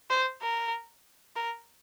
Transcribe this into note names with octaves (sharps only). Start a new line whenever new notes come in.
C5
A#4
A#4